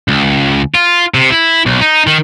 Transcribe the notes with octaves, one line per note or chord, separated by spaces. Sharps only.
C#2
F4
C3
E4
B1
D#4
D#3